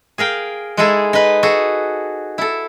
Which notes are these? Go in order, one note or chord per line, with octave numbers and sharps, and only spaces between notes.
G#4 A#4 F5 G5
G#3 D#4 E4 G#4 A4
D#4 B4
F#4 G#4 A4
E4 A4